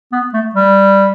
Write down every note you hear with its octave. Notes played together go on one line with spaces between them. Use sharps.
B3
A3
G3